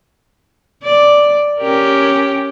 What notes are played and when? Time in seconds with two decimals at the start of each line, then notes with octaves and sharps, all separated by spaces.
0.83 D5
1.60 C#4 G4 A#4